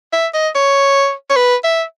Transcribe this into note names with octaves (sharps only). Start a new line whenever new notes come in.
E5
D#5
C#5
C#5
B4
E5